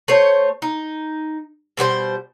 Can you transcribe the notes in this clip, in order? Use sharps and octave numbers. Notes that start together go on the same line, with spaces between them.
A3 C5 C#5
D#4
B2 G3 F#4 C5